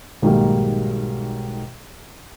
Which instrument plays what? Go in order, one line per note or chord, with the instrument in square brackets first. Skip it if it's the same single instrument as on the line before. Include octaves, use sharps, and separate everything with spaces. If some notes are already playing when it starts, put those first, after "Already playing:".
[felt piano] B1 G#2 D#3 F#3 G3 A#3